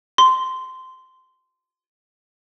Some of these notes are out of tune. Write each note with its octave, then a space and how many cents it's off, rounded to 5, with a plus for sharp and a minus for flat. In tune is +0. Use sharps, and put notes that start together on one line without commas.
C6 -15